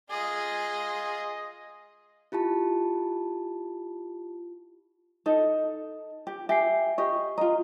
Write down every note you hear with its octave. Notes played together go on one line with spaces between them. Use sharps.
F4 G#4 D#5 G#5
E4 F4 G4 A5
D#4 A4
G4
G4 E5 G#5 C7
G4 D#5 C#6
F4 D#5 A#5